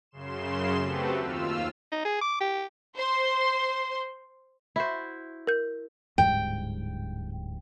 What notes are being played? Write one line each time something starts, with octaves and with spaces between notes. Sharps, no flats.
F#2 C#3 C6 E7
A3 C4 F#4 G4 A4 B4
D#2 F4 E6 F6
D#4
G#4
D6
G4
C5 C6
E4 F#4 C5
A#4 G6
D1 G#2 G3 G5